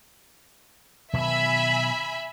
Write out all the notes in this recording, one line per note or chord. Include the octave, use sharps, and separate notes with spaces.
B2 D#3 F#3 E5 G#5 B5